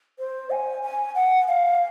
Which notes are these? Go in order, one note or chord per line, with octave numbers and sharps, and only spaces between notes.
C5
G#5
G#5
F#5
F5